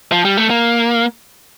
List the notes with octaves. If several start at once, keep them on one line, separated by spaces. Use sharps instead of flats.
F3
G3
A3
A#3